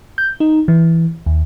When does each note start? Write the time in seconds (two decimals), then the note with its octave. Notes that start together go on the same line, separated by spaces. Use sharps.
0.18 G6
0.40 D#4
0.68 E3
1.26 D#2